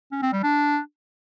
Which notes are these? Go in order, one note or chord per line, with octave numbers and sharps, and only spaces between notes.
C#4
C4
G3
D4